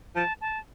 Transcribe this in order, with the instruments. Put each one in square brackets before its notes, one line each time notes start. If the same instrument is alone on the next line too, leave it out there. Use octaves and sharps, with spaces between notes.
[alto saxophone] F3 [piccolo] A5
[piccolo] A5